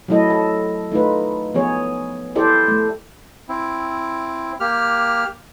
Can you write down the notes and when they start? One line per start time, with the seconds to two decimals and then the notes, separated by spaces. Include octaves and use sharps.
0.08 F#3 A3 E4 A4 D#5
0.30 A4
0.91 A3 D#4 F4 B4
1.55 F3 B3 G#4 C#5
2.35 E4 G4 A4 C5 D5
2.68 A3
3.49 C4 E4
4.60 A#3 G4 F6